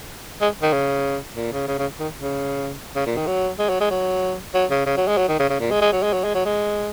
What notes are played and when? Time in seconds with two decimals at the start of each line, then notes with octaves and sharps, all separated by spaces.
0.41 G#3
0.62 D#3
0.73 C#3
1.36 A#2
1.52 C#3
1.68 C#3
1.79 C#3
2.00 D#3
2.21 C#3
2.96 C#3
3.06 A#2
3.17 D#3
3.27 F#3
3.59 G#3
3.69 F#3
3.80 G#3
3.90 F#3
4.54 F#3
4.71 C#3
4.86 C#3
4.97 F#3
5.08 G#3
5.17 F#3
5.28 D#3
5.40 C#3
5.50 C#3
5.60 A#2
5.71 G#3
5.81 G#3
5.92 F#3
6.03 G#3
6.13 F#3
6.24 G#3
6.34 F#3
6.45 G#3